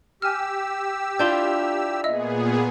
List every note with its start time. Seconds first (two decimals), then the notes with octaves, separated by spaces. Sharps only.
0.22 G4 G#5 E6 F6
1.19 D4 E4 F4 G6 E7 G7
2.04 A#2 B3 G#4 D#5 E5 E6